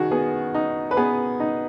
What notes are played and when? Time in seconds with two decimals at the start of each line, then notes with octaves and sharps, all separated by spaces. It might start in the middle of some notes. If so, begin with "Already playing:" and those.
Already playing: D#3 F#4 G#4
0.11 B3 G#4
0.55 D#4
0.91 B4
0.97 B3 G#4
1.40 D#4